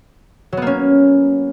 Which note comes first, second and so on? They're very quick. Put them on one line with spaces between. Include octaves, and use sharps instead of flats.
F#3 B3 A#3 C#4